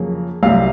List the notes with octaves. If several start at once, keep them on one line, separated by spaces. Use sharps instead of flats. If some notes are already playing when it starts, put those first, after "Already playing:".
Already playing: F2 C#3 F#3 A#3
C2 C3 F#3 F5